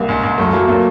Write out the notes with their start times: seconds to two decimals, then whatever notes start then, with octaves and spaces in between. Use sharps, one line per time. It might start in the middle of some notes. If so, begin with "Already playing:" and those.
Already playing: C2 A#3
0.08 C#2
0.24 C#2
0.38 F#2 A3
0.53 F#3 A#3
0.68 A#2 A#3